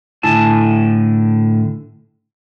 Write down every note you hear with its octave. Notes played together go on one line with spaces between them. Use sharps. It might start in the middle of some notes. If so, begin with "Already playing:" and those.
A2 D3 E4 G#5 A5